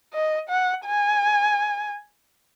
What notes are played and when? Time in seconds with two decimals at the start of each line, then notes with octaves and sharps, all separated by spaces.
0.14 D#5
0.49 F#5
0.86 G#5